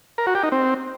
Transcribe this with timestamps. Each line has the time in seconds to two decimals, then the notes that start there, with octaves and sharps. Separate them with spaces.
0.18 A#4
0.27 F#4
0.35 G4
0.43 D#4
0.52 C4